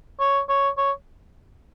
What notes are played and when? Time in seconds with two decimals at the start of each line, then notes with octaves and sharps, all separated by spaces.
0.20 C#5
0.49 C#5
0.77 C#5